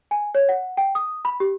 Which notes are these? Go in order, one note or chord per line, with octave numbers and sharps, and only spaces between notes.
G#5
C#5
F#5
G5
D#6
B5
G4